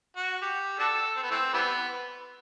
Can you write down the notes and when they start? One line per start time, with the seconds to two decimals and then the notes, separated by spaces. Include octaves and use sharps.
0.16 F#4
0.42 G4
0.79 D4 F#4 A4
1.16 C4
1.23 B3
1.31 E3 A3 C4
1.53 E3 G3 B3